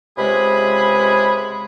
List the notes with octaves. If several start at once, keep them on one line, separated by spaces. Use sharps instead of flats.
C#2 C3 G#3 G#4 B5